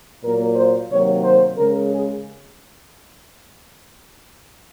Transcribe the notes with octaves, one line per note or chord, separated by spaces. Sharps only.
A#2 F#3 A#3 A#4
C5
C3 D#3 F#3 A#3 C#5
C5
C#3 G#3 A#4
G#4